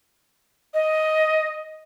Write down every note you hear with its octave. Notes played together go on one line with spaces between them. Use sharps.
D#5